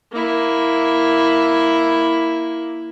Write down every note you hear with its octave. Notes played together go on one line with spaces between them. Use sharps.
A#3 E4